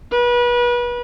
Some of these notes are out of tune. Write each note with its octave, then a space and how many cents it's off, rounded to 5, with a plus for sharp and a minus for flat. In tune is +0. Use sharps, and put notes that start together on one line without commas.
B4 -30